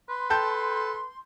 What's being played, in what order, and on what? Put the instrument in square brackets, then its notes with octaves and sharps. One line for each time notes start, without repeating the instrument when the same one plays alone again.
[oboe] B4 [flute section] C6
[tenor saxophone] A4 [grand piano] G5 A5 G6